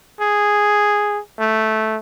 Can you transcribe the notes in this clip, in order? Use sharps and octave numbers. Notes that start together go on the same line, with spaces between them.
G#4
A3